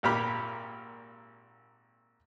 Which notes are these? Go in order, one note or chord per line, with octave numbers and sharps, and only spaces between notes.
G#1 A#2 G4 A#4 B5 F6